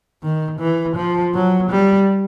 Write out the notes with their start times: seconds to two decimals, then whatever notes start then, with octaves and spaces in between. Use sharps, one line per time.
0.23 D#3
0.60 E3
0.96 F3
1.34 F#3
1.70 G3